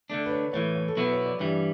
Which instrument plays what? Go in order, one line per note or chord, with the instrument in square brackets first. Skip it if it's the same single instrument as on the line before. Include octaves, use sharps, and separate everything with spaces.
[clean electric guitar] D3 A3 D4
[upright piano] B4
C#5
[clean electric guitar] A2 E3 A3 [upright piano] C#5
[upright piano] C#5
A4
[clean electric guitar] B2 F#3 B3 E4 [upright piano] B4
[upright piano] C#5
D5
[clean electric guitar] G2 E3 G3 [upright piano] E5